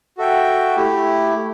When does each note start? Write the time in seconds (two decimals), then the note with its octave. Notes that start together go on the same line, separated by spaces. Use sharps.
0.17 F#4 A4 E5 G5
0.76 A3 E4 G4